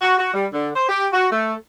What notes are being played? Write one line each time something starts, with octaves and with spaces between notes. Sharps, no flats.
F#4
F#4
G3
D3
C5
G4
F#4
A3